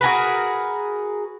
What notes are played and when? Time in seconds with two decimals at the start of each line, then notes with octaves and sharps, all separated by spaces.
0.01 F#4 G#4 A#4 B4